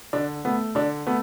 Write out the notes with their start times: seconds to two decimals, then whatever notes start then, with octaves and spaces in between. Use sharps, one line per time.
0.13 D3 D4
0.45 A3 B3
0.75 D3 D4
1.07 A3 B3